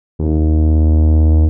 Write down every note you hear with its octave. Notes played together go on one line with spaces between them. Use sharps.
D#2